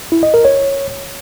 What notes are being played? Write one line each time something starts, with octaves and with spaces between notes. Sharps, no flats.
E4
D#5
A#4
C#5